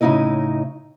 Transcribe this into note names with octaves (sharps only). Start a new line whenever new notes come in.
A2 C#3 A#3 D#4 E4 D#5